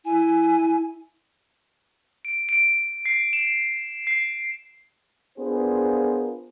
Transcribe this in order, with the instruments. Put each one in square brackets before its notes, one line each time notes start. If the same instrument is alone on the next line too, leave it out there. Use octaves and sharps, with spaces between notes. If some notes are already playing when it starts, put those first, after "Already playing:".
[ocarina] E4 [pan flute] G#5
[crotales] D7
D7
C7
E7
C7
[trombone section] B3 D4 F4 G#4 A#4 C5